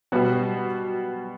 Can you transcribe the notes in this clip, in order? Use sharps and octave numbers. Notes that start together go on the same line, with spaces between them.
B2 G3 B3 F#4